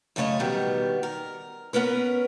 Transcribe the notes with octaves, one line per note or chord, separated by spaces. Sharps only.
F#2 C#3 A3 C#5 D#5
B2 D#3 G3 B3
A#4
B3 C#4 A#4 B4